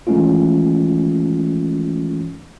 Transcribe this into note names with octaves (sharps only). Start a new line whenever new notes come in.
E3 G#3 A3 C#4 D#4 F4